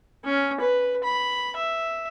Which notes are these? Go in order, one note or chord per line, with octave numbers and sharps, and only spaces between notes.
C#4
B4
B5
E5